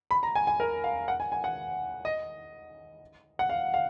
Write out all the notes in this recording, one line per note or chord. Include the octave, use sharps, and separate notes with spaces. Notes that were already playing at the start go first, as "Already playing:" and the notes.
B5
A#5
G#5
G#5
A#4
F5
F#5
G#5
G#5
F#5
D#5
F#5
F5
F5